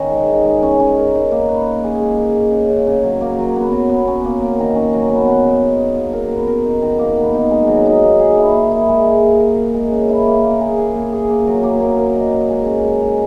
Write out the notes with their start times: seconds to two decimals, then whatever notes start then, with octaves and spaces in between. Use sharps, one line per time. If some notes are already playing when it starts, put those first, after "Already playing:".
Already playing: D#3 C#4
0.11 G#3
0.29 D#4
0.45 G#3
0.63 C#4
0.80 C#4
0.97 A#4
1.15 D#4
1.31 A#3
1.48 B4
1.66 A#3
1.84 G#4
2.00 G#3
2.18 G#3
2.36 G#3
2.52 C#3
2.69 C#3
2.87 C#3
3.04 F#3
3.21 A#3
3.38 F#3
3.56 B3
3.72 F#3
3.89 B3
4.07 C#4
4.24 A#3
4.42 A#3
4.59 D#3
4.75 C#4
4.93 F#3
5.09 B3
5.27 F#4
5.44 C#3
5.61 D#4
5.78 C#3
5.95 A#3
6.13 A#4
6.31 B3
6.47 A#4
6.65 D#4
6.82 D#3
6.99 A#3
7.16 B3
7.34 D#4
7.51 G#3
7.67 F#3
7.86 D#4
8.03 A#3
8.20 G#4
8.37 E4
8.53 A#3
8.71 E4
8.89 G#3
9.06 G#3
9.22 A#3
9.40 A#4
9.57 A#3
9.74 G#3
9.91 C#3
10.09 E4
10.26 A#3
10.44 A#3
10.61 G#4
10.78 G#4
10.95 A#3
11.13 G#4
11.30 A#3
11.47 F#3
11.63 A#3
11.80 A#3
11.98 A#4
12.15 D#5
12.32 C#4
12.50 G#3
12.66 C#4
12.83 G#3
13.01 G#3